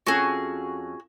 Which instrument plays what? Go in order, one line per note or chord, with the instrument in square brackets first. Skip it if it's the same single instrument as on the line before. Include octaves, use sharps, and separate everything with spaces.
[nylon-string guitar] F2 C#4 A4 [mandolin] F#4 G#4